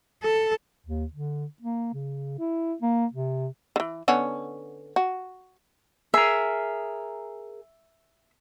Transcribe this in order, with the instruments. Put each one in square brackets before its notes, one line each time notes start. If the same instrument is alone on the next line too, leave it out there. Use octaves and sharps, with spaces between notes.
[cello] A4
[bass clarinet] D#2
D3
A#3
C#3
E4
A#3
C3
[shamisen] D3 E3
D3 B3 C#4
F#4
[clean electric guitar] G#4 A#4 [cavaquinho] E5